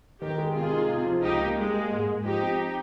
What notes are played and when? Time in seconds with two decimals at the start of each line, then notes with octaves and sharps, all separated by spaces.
0.21 D#3 G4 A#4
0.38 G#3
0.55 C3 F4 G#4
0.72 D#4
0.89 C3
1.06 F3
1.22 C#2 D#4 G4
1.40 A#3
1.56 G3 G#3
1.74 A#3
1.91 G#2
2.07 G#2
2.24 F3 D#4 G4
2.41 C4